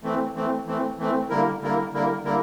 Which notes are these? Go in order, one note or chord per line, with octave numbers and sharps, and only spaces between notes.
E3 A3 C4
E3 A3 C4
E3 A3 C4
E3 A3 C4
D3 G3 A#3 E4 A#4
D3 G3 A#3 E4 A#4
D3 G3 A#3 E4 A#4
D3 G3 A#3 E4 A#4